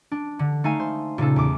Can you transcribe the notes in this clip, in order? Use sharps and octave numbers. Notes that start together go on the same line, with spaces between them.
D4
D3
A3 D#4 F5 G#5
C5
A#2 C#3 D#4 A4
E2 D6